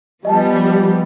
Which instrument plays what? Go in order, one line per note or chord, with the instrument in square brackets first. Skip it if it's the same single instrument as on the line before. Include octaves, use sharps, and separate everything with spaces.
[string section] F3 G3 B3 [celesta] D#5 G#5 A5